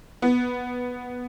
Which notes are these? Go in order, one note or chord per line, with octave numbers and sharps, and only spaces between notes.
B3